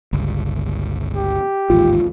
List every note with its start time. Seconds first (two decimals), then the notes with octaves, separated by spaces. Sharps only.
0.13 G1 C#2
1.15 G4
1.70 A1 D#2 G#2 F4